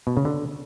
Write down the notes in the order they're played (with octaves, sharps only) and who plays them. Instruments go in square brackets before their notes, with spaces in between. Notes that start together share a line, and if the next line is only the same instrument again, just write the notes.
[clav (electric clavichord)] B2
C#3
D3